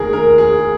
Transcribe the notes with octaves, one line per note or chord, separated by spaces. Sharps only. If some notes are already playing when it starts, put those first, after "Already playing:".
Already playing: F1 D#2 D#3 G#4 A#4
A#4
G#4